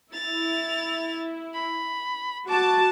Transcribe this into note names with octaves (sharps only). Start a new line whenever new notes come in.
E4 A6 F7
B5
F#4 A5 D6